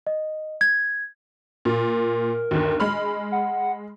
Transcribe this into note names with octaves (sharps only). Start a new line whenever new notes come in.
D#5
G#6
A#2 A#4
G1 D#2
G#3 B5 F6
F#5